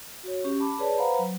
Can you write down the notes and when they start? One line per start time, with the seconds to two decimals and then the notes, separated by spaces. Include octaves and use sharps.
0.23 F#4 C#5
0.44 C#4 G4
0.60 A5 B5 D6
0.79 G#4 B4 C#5 D5 A5
0.98 B4 C5 F5 F#5 A#5 B5
1.19 F#3